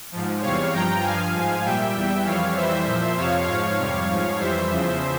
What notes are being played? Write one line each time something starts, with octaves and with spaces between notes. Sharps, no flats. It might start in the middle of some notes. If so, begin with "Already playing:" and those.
G#2 F3
E2 C3 G3 C#5 F5
G2 F3 G5 A#5
G2 F3 F5 G#5
G#2 F3
A#2 G3 E5 G5
E2 E3 G3
F2 E3 G3 C#5 F5
F2 E3 G3 C5 E5
A#2 F3
F2 C3 F3 C#5 F5
G#2 F3 C#5 F5
F2 C3 G3
G#2 F3
F2 E3 G3 C5 E5
E2 C#3 F3